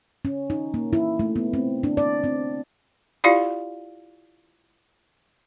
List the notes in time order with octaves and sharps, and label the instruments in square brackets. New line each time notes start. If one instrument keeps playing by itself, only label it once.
[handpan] C#4
D#4
A#3
E4
A3
B3
C4
D4
D5
C4
[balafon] E4 F4 G4 D5 F5